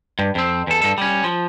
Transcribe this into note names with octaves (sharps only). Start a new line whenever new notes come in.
G2
F2 C4
E2 A4
G2 A4
G3 C#4
F3